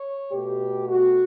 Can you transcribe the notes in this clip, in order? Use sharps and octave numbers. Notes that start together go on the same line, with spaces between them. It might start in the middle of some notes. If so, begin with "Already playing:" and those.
Already playing: C#5
B2 A3 G4
F#4